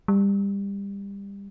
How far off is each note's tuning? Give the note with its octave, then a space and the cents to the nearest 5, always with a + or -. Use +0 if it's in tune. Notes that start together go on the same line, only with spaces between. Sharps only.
G3 +25